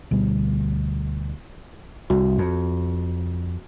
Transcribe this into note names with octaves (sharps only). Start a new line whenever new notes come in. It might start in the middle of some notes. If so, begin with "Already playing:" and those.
D2 B2 G3
C2 F#4
F2